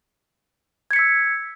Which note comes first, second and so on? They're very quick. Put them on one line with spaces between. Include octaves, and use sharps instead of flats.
G#6 C#7 B6 E6